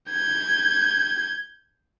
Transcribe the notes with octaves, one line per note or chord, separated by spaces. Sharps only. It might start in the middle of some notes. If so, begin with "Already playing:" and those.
G6 G#6